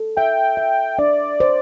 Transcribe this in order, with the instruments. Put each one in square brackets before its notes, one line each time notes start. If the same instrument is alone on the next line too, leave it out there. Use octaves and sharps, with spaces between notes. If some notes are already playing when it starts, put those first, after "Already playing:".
Already playing: [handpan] A4
[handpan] E5 [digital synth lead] G5
[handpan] E5
[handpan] D4 [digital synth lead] D5
[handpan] C5